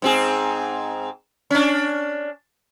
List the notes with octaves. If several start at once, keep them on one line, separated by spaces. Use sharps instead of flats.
G#2 C4 G#4
C#4 D4